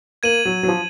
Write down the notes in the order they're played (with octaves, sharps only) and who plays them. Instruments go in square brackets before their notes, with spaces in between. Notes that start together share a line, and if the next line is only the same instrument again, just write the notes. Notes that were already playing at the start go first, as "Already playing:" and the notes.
[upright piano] A#3 [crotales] G#6 D#7 F#7
[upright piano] F#3
F#3
F3